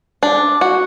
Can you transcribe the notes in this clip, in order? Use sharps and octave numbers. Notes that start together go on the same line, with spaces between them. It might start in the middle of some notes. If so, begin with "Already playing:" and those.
D4
F#4